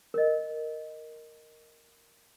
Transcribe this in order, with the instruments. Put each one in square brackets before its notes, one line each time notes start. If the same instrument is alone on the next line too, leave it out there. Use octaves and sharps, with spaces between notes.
[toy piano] A#4 D#5